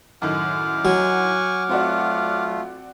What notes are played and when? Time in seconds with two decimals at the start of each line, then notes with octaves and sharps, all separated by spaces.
0.22 F#2 A2 D#3 F#5 D6 F6
0.85 F#3 G#5 C#6
1.69 A3 C4 F4 F#4 D5